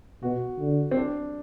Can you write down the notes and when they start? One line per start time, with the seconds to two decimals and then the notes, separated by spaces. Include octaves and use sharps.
0.23 B2 F#4
0.59 D3
0.91 C4
0.97 D4